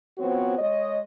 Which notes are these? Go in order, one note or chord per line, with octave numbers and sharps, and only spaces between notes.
F3 B3 C4 F#4 C#5
G#3 C#5 D#5